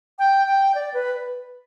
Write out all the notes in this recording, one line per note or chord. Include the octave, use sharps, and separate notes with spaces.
G5
G5
D5
B4